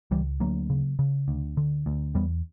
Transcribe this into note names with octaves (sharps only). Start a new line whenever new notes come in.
C#2 E3 G3
D2 F#3 A#3
C#3
C#3
D2
D3
D2
E2 G3 B3